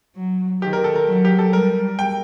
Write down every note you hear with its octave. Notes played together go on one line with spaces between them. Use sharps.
F#3
D#3 G4
A#4
A4
A#4
F#3
G4
A4
G3 A#4
G5